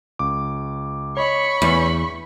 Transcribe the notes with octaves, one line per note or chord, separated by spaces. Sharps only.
C#2 D6
C#5 D#5 B5 C#6
E2